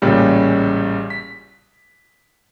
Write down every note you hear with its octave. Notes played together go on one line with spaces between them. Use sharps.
A1 A#2 C#3 G3 C#4
B6